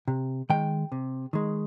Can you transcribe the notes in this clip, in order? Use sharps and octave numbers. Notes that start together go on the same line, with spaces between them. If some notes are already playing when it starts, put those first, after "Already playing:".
C3
D#3 G#3 G5
C3
D#3 G#3